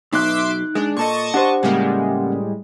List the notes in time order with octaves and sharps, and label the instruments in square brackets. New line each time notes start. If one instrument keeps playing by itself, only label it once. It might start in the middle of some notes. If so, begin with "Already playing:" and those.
[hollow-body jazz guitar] B1 B2 [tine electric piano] D#4 F#6 [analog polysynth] E5 C6 D6
[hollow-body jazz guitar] G#3 [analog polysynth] D4
[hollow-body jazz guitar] A#2 A4 [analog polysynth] D#5 A5 C#6
[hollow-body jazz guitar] D4 C5 [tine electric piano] G4 F#5
[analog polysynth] A2 G3 G#3 [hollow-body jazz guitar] C#3 A#3